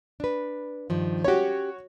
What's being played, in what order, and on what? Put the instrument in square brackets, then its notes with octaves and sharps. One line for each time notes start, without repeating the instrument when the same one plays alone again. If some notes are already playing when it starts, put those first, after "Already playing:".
[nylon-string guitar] D4 B4
G2 D#3 F3
[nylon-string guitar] C#4 G4 [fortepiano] F#4 C#5